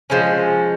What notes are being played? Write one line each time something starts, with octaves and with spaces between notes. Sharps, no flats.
F3 G#3 C#4